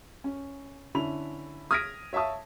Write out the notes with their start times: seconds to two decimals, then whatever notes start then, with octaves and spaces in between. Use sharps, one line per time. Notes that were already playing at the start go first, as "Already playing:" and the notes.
0.24 C#4
0.95 D3 C#4 E4 B5 F7
1.71 D#6 F6 G#6 A#6 B6 D7
2.13 C#5 E5 F5 A5 D#6